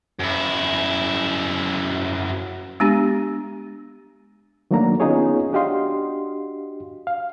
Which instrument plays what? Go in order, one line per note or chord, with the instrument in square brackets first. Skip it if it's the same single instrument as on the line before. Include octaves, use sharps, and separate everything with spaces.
[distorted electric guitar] F#2 E4
[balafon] G#3 B3 D4 G4
[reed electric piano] D#3 F#3 A3 A#3 D4 A#5
B3 C#4 D#4 F4 G#4 C#5
D4 F#4 G4 D#5 F5 C6
F5